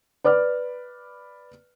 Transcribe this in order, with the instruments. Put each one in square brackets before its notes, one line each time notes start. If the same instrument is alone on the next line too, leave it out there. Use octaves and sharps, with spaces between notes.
[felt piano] B4 D5 D6 F6